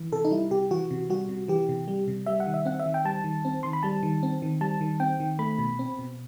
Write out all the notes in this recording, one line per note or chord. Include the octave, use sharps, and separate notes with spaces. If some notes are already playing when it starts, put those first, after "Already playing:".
Already playing: E3
C3 A4
D#4
G3 E4
C3 G4
E3 F#4
C3
G3 F#4
C3
E3 G4
C3
G3
C3
G3 E5
F#5
D#3
E5
C4 F#5
E5
D#3
G5
G3 A5
D#3
C4
D#3 C6
B5
G3 A5
D#3
C4
D#3
G3 A5
D#3
C4 G5
D#3
A3 B5
B2
C4
B2